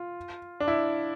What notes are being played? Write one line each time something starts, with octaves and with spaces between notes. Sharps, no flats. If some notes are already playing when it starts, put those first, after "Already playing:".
Already playing: F4
D4
E4